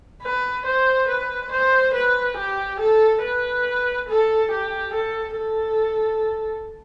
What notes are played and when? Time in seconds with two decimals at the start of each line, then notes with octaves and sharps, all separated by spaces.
0.22 B4
0.65 C5
1.09 B4
1.52 C5
1.94 B4
2.37 G4
2.80 A4
3.23 B4
4.08 A4
4.51 G4
4.94 A4
5.36 A4